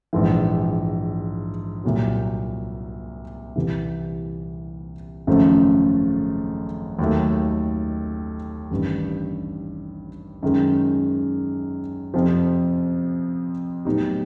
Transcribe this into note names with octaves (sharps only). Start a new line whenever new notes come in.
A#1 G#2 E3
C2 A#2 F#3
C2 C3 E3 G3
G#1 F#2 C#3 F3 A3
D#2 D#3 F#3 A3
A1 G2 D#3
F#2 D#3 G#3
F2 C3 F3
A2 F#3 B3 D#4 G4